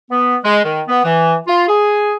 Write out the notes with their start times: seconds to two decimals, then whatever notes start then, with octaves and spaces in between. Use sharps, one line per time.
0.10 B3
0.44 G#3
0.64 D#3
0.88 B3
1.04 E3
1.47 F4
1.68 G#4